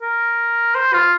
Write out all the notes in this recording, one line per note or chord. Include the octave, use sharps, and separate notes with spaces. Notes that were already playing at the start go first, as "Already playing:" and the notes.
A#4
C5
F4